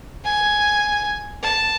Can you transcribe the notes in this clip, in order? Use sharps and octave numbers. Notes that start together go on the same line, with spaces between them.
G#5
A5